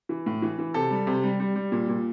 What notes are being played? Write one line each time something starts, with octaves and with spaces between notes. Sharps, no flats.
E3
A2
E3
E3
C3 A4
G3
C3
G3
G3
G3
A#2
A#2